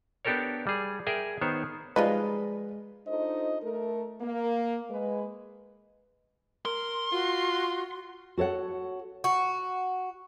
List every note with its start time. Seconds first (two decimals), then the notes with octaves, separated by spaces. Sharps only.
0.25 B3 D4 G4 A4 A#4 C#5
0.67 G3 G#4
1.07 G#4 A#4 E5 G5
1.41 D#3 B3 C5 C#5
1.96 F3 G3 G#3 D#4 B4 D#5 F5
3.07 D4 D#4 F4 A4 C5 D#5
3.62 A3 A4 A#4
4.21 A#3
4.89 G#3 B4
6.65 A#4 C6
7.12 F4 F#4
8.37 F#4 A4 C#5 F#5
9.24 F#4